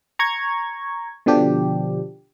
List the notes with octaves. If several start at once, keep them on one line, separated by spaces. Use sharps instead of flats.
A#5 C#6 G#6
B2 D3 F3 D4 G4